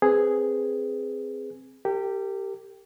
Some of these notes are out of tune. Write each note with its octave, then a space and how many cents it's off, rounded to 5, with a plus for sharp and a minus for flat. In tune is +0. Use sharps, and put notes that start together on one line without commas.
C4 +0 G#4 +0 B4 +0
G4 +0 A#4 -40